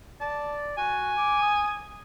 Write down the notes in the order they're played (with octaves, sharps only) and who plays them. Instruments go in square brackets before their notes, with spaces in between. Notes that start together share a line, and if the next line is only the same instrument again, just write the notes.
[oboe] D5 [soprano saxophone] A5
[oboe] F#4 [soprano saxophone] G#5
[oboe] D6
D#6